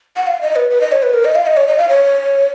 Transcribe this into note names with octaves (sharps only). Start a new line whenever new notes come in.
F#5
F5
D#5
B4
B4
D#5
C#5
B4
A#4
D#5
F5
D#5
C#5
D#5
F5
C#5